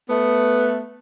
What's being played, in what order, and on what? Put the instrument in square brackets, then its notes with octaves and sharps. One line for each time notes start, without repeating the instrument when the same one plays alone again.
[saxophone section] A3 B3